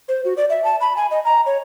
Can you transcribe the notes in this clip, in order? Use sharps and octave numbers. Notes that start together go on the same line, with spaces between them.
C5
F#4
D5
E5
A5
B5
G#5
D#5
A#5
C#5